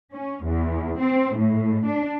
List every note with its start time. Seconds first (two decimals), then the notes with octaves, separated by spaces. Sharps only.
0.14 C#4
0.45 E2
1.00 C4
1.37 A2
1.86 D4